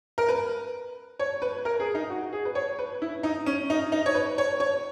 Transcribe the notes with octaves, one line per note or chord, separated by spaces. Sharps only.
A#4
B4
C#5
B4
A#4
G#4
D#4
F#4
G#4
B4
C#5
B4
E4
D#4
C#4
D#4
D#4
C#5
B4
C#5
C#5